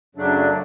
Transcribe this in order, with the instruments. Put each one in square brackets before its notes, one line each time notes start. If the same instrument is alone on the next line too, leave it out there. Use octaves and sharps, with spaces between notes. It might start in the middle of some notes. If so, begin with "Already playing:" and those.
[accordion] F#2 C#3 F#3 A3 D4